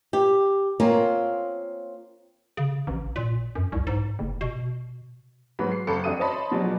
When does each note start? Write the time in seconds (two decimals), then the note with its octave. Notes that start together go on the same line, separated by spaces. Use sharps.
0.13 G4
0.80 A#3 C4 C#4 F4
2.57 C#3
2.87 A1
3.16 A#2
3.55 F#2
3.72 C2
3.87 G#2
4.19 F#1
4.41 B2
5.59 G#2 F#3 B3 B5
5.72 C7
5.87 F#1 A4 B5 C#7
6.04 F2 D4 F#4 E5 D#6 D#7
6.19 C5 C#5 D#5 A5 B5
6.52 B2 F3 F#3 D4 G#4